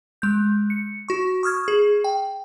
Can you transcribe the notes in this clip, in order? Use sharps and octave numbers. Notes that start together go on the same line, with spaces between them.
G#3 G6
C#7
F#4 C#6
C#6 D#6 F6 G#6
G#4
G5